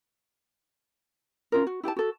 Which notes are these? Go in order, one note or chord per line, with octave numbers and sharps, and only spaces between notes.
C#4 F4 A#4
F#4
E4 G4 F#5 A5
F#4 A4